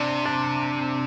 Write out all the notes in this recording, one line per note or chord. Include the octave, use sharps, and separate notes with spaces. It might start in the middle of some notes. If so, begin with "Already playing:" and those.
Already playing: C3 D4 D5
D4 D5